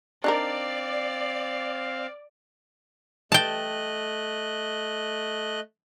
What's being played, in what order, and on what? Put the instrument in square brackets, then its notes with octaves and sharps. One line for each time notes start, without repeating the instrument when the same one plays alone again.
[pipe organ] C4 F5 [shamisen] D4 D#4 A#4 [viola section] D5
[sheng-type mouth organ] A3 D#5 F#6 [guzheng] G5 A5